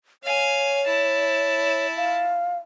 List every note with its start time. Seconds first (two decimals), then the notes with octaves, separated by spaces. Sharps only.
0.24 C#5 F5 G#5
0.86 E4 A5
1.96 F5